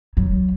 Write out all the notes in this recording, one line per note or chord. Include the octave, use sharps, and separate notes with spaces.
F#3